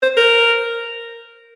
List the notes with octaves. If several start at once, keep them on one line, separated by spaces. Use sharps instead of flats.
C5
A#4